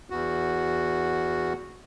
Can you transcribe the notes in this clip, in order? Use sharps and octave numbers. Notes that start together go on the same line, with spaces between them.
E2 F#4